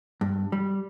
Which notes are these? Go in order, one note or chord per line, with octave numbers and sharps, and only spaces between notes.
G2
G3